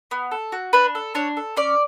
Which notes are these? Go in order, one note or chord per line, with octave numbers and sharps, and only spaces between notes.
B3
A4
F#4
D4 B4
A4
D4 C#5
A4
C#4 D5